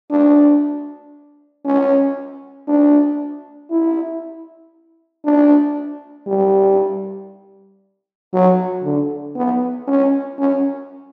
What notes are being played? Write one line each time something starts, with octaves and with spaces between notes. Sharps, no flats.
D4
C#4
D4
E4
D4
G3
F#3
D3
B3
C#4
C#4